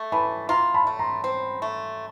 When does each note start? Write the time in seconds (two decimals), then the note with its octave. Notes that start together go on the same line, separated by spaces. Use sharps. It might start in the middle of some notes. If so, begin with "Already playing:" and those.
Already playing: A3
0.12 E3 A5 B5
0.49 F4 A#5 C6
0.74 A5 B5
0.87 A3
0.99 A#5 C6
1.24 C4
1.62 A3